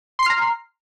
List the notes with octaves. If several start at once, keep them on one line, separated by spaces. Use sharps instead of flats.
A#5 C6 F6 C7